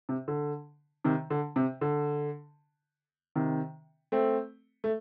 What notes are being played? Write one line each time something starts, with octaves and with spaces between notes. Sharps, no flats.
C3
D3
C3 D#3
D3
C3
D3
C3 D#3
A3 C4
A3